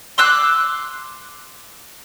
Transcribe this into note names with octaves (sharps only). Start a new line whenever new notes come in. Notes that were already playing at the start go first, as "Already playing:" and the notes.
C6 D6 E6 F#6